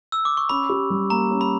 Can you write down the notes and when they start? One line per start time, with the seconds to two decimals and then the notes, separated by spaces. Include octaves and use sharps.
0.12 E6
0.25 D6
0.37 C#6
0.49 C#4 B5
0.69 G4
0.90 G3
1.10 A#3 A#5
1.31 C#4
1.41 B5